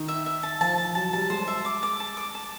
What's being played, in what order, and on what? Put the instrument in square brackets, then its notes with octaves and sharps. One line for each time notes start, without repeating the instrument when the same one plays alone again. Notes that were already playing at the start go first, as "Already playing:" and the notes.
Already playing: [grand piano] D#3
[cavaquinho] E5
E5
A5
[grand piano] F3 [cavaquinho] A5
[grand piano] F3 [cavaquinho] A5
[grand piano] F#3 [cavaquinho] A5
[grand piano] G3 [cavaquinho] A5
[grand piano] G#3 [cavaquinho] C5
[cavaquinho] E5
D6
D6
A5
D6
A5